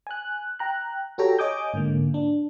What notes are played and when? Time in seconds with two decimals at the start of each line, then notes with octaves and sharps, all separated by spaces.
0.07 G#5 F#6
0.59 G5 A#5 F#6
1.18 F#4 G4 A4 C#5 G5 A#5
1.39 C#5 D#5 G#5 D6 D#6 G6
1.73 G#2 D3 A#3
2.14 D4